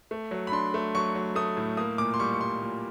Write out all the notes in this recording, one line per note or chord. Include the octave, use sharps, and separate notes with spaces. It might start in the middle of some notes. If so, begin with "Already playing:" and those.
A3
F#3
B5
D4 C6
A3
F#3 C#6
F#3
A3 D#6
A2
A#3 D#6
A#2 D6
C6
G3 C#6
C#6
G3 C6
A#2